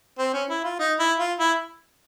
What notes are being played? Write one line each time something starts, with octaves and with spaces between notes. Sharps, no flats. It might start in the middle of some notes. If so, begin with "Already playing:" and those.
C4
C#4
E4
F4
D#4
E4
F4
E4